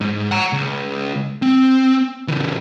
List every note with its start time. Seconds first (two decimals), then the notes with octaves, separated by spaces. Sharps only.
0.01 G#2
0.31 F#5 A#5
0.53 C#2
1.42 C4
2.28 C#3 E3